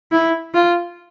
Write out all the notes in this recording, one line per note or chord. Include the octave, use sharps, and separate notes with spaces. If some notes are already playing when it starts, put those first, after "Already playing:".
E4
F4